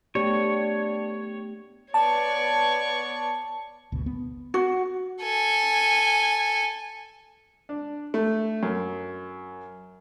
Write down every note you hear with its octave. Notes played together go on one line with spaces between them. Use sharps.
A3 B3 D4 G4 C#5
B3 C#5 D5 A5 C#6
G#1 D2 B2
B3
F#4
A4 G#5
D4
A3
F#2